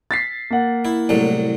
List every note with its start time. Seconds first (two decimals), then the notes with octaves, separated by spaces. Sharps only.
0.11 A6 B6 C7
0.50 A#3 F#5
0.85 E4
1.09 C2 A2 F#3